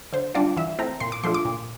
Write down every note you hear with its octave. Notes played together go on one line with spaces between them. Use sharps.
D3 C5
G3 D4 F4 D5
E3 E5
A3 C4 E4 A#5
A#2 C6
D6
F3 A3 D4 F4 C6
D6
A#2